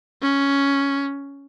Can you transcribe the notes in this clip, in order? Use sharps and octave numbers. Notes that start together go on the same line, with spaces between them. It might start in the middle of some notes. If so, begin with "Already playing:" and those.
C#4